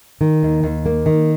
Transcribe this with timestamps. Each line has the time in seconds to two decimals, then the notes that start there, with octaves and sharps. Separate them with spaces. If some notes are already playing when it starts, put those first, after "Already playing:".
0.21 D#3
0.43 D#2
0.64 D#2
0.86 A#3
1.06 D#3